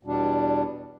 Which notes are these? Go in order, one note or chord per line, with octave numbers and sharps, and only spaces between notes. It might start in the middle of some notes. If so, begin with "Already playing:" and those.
E2 B2 G3 D4